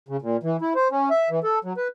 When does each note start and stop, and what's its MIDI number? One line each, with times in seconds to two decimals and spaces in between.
0.09 0.17 49
0.22 0.37 46
0.43 0.57 52
0.61 0.73 64
0.75 0.88 72
0.91 1.09 61
1.10 1.29 76
1.30 1.40 52
1.44 1.59 69
1.64 1.73 54
1.77 1.88 71